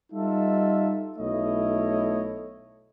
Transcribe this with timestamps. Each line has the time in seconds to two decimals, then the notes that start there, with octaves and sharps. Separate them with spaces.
0.13 G3 D#4 F4 A4 E5
1.17 B1 A3 E4 C#5 D#5